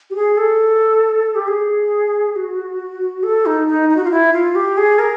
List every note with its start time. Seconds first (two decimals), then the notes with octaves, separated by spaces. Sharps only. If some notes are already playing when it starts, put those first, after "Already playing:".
0.10 G4
0.15 G#4
0.37 A4
1.35 G4
1.48 G#4
2.36 F#4
3.23 A4
3.46 D#4
3.67 D#4
3.89 D#4
3.97 F#4
4.04 F4
4.11 E4
4.33 F4
4.55 G4
4.77 G#4
4.99 A#4